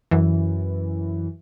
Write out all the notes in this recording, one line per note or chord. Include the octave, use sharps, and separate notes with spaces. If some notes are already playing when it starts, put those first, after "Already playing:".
F#2 E3